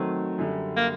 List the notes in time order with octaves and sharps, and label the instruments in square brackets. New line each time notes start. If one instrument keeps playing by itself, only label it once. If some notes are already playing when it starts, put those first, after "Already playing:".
Already playing: [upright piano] D#3 F#3 A3 C4
F#2 D3 G3
[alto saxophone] A#3